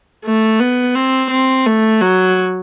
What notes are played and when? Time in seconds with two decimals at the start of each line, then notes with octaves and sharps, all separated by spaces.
0.25 A3
0.60 B3
0.95 C4
1.30 C4
1.66 A3
2.01 F#3